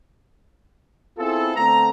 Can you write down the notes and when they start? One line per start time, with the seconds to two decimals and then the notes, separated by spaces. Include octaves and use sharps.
1.19 B3 C4 E4 F4 G#4 A4
1.56 D3 A3 B3 C4 A#5